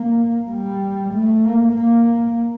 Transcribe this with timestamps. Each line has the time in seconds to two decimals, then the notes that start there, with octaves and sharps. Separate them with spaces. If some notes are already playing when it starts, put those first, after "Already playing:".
Already playing: A#3
0.51 G3
1.13 A3
1.45 A#3
1.76 A#3